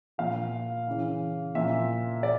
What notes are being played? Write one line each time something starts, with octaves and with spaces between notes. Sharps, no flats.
A#2 F3 F5
C#3 E3
A#2 F3 E5
D5